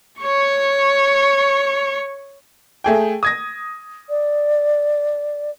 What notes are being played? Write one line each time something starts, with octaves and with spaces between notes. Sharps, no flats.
C#5 C#6
A3 G#4 G5
D#6 G#6 A#6
D5